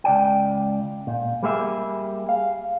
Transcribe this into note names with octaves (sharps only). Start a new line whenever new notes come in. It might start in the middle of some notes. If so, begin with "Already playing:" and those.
C#2 D5 G5
A#2
G3 A#3 G4 G#4 E5
F5